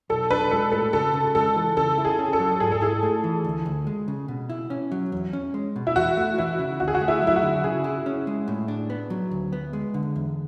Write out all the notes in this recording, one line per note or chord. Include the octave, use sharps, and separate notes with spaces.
B1 A4
D4 B4
G#3 A4
A2 A4
C#3 A4
C#3
G#3 A4
E3
C#3 A4
E4
G#4
C#4
A4
F#3
G#2 G#4
A4
E4 G#4
A3
E3
D2
D2
G#3
C#3
B2
E4
C#4
F#3
E2
C#4
G#3
B2
E4
E2 F#4
A3
E3 E4
C#3
D2 F#4
G#4
F#4
A3
E4
F#3
E4
F#4
D3
C#3 G#4
E4
C#4
G#3
A2
D4
B3
F#3
D2
B3
G#3
D3
E2